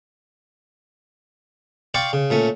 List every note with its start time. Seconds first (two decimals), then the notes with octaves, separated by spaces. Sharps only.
1.94 D5 F5 G5 C6 C#6
2.13 C#3
2.30 A#2 A3 C#4